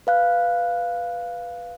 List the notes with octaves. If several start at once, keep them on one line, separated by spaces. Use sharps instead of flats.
B4 F5 F#6